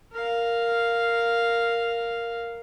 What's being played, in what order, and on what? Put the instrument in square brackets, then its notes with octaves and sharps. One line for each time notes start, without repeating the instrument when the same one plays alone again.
[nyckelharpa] A#4 F5